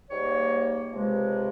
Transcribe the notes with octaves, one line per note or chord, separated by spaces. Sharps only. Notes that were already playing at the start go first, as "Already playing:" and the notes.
G#2 G3 A#3 C#5
C#2 C3 F3 G#3